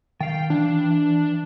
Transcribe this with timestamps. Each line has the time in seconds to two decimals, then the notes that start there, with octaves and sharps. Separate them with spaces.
0.20 D#3 F5 G5
0.50 E3 D4